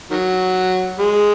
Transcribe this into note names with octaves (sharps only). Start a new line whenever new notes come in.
D#3 F#3
G#3